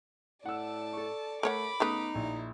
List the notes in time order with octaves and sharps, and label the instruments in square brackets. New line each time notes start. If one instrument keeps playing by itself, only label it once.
[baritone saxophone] A2 [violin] D5 A5 [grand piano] F#5 E6
[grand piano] A4 C#6
[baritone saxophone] A3 [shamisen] A#4 C#5 F#5 [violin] B5 D6
[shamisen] C#3 A3 B4 [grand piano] B3 D#6 [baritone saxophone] D#4
[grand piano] A#1 [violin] E4